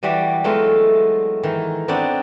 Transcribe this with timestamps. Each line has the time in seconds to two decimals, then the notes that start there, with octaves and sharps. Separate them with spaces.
0.03 E3 G3 F#4 D5 E5
0.44 E3 F#3 G#3 A3 B3 F4
1.43 D#3 E3
1.88 B3 C4 D4 D#4 C#5 D5